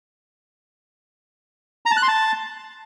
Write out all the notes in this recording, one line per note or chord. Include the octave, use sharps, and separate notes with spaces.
A#5
A5
F#6
C6
A5